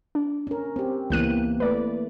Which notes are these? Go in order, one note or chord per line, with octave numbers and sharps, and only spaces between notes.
D4
C#4 A#4
C4 G4
C#2 E3 A#3 B3 F#6 D#7
A3 B4 D5